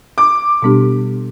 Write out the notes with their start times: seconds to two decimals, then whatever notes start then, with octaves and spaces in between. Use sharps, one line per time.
0.18 D6
0.62 B2 G3 B3 D4 G4